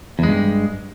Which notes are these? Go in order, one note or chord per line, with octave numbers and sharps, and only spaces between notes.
E2 G2 G#3